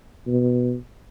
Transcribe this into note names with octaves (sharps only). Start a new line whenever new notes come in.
B2